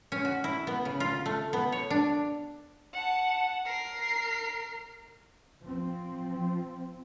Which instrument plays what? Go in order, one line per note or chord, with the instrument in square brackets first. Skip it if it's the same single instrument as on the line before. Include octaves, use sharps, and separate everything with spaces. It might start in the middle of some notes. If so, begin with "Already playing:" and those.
[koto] C#4
F#4
E4
B3
C#3
F4
A3
B3
C#5
D4
[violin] F#5 A5
A#4 C7
[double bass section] F3 C4